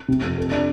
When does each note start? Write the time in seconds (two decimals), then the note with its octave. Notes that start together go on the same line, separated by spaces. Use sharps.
0.08 C3
0.22 F2
0.38 A4
0.52 D4